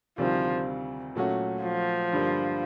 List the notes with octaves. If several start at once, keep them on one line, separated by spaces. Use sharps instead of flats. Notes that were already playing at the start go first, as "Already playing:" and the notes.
D2 C3 D#3 F3 G3 C4
A#2 F#3 A3 C#4 F#4
F3
G2 D3 G3 A#3